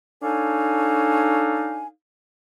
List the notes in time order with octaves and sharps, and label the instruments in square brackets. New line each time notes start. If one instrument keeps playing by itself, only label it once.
[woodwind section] D4 D#4 A4 C#5 F5 G#5